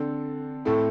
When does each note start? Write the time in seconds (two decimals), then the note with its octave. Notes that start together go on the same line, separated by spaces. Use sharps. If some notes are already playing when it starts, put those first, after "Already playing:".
Already playing: D3 C4 A4
0.65 A2 A3 C4 E4 A4